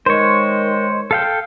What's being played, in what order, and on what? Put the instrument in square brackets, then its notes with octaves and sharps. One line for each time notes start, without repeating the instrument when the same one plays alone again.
[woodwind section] D#3 G#3 [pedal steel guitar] C5 C#5
[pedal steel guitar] A4 F5 G5